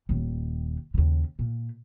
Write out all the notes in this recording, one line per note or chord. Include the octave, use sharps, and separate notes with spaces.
D#1 D#3
D#2 C#3
A#2